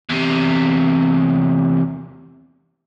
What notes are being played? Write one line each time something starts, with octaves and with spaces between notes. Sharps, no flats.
E2 C3